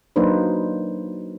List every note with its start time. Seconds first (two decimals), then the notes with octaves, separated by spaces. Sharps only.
0.16 F#3 A#3 D4 D#4 B4 C5